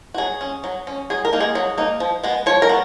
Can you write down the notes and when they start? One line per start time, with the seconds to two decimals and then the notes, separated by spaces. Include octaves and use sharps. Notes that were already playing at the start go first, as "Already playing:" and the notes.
0.14 F#4
0.18 F#3 G#4
0.41 C#4
0.64 F#3
0.87 C#4
1.10 F#3 G#4
1.25 A#4
1.33 A#3 D#4
1.40 G#4
1.55 F#3
1.78 A#3 D#4
2.00 F3
2.24 G#3 B3
2.46 F3 C#5
2.62 A#4
2.69 B3